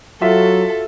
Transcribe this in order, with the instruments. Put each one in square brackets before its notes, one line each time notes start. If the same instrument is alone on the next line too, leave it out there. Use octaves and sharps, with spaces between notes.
[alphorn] F#3 [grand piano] F4 F#4 E5 [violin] A4